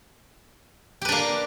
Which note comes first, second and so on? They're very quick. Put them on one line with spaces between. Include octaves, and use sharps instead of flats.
G4 B4 D4 A#3